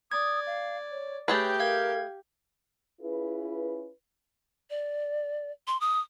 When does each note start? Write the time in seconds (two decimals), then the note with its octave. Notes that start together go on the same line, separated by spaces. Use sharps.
0.12 D5 D#6 G#6
0.47 F5
0.91 C#5
1.28 A3 G4 G#4 B4 C#5 G5
1.60 A#4 F5 G#6
3.01 C#4 E4 F4 G#4 B4
4.70 D5
5.67 C6
5.81 D#6